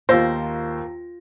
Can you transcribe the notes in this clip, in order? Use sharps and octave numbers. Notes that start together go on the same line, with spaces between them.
D#2 A#3 F4 C5 E6 A#6